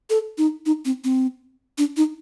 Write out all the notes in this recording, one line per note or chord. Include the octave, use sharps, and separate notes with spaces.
A4
D#4
D#4
C4
C4
D4
D#4